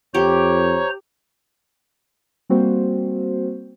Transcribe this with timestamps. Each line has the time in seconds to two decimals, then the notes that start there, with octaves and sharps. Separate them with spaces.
0.14 F2 G4 C5 C#5 A#5
2.49 G3 A#3 C4 F#4 C5